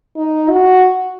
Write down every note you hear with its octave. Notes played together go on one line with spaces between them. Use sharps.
D#4
F#4